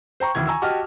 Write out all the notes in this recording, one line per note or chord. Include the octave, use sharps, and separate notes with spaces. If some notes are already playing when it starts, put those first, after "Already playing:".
C5 G5 A#5 C#6
D2 D#3 E3 G#6
G#5 A#5 C#6 E6
F#4 G4 D#5 A5 F6